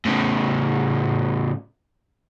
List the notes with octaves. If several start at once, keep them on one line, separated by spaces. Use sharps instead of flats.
A2 C#3